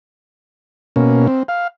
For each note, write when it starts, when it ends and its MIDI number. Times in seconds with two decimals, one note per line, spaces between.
0.96 1.27 47
0.96 1.27 58
0.96 1.27 61
1.27 1.43 60
1.48 1.67 77